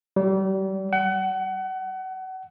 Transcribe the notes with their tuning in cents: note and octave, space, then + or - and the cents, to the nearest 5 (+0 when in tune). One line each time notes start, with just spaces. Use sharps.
G3 -35
F#5 +30